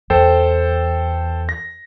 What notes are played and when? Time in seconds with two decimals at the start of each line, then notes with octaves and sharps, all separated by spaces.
0.10 E2 A4 C5 G5
1.49 A#6